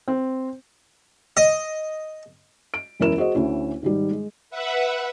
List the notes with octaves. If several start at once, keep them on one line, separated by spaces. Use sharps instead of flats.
C4
D#5
D7
E1 F#2 C#4 E4 A#4 E7
F#4 G#4 C5 D#5
D2 C#4 E4
G#2 D#3 G3
G#3
B4 E5 F#5